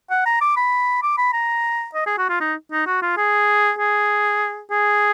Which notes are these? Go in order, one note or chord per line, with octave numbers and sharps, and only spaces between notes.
F#5
A#5
D6
B5
D6
B5
A#5
D#5
G#4
F#4
F4
D#4
D#4
F#4
F4
G#4
G#4
G#4